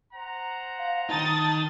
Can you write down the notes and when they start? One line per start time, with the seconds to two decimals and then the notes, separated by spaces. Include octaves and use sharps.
0.14 C5 F#5 A#5
0.79 F5
1.10 D#3 D#4 A5 D#6 A6